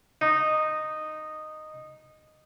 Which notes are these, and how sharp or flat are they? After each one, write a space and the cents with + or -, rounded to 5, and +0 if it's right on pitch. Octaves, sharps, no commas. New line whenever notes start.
D#4 -10